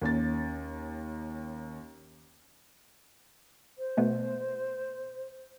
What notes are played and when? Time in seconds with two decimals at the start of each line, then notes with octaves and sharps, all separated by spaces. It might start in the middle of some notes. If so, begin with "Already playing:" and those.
0.02 D#2 C#4 A6
3.78 C5
3.97 B2 A3 B3